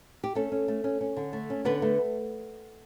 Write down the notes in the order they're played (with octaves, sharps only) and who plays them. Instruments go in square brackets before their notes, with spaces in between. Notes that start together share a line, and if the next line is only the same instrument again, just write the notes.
[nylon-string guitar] G4
A3 C#4 A4
C#4
A3
C#4
C#4
D3
A3
C#4
D3 B3 B4
A3